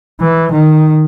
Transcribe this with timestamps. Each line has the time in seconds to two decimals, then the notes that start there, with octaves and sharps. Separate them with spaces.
0.20 E3
0.51 D#3